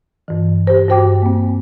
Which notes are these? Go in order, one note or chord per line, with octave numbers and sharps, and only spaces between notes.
G2 E3
G4 C5
G2 F#4 C5 G5 D6
A#3 C4